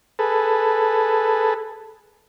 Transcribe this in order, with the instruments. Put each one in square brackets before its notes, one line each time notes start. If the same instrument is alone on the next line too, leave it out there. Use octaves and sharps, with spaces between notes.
[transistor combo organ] G#4 A4 B4